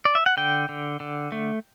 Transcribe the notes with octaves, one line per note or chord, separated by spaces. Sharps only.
D5
E5
F#5
D3 G5
D3
D3
A3